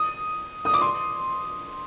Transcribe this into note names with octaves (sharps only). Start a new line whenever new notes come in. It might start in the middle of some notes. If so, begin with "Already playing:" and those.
Already playing: D#6
D#6
D6
C6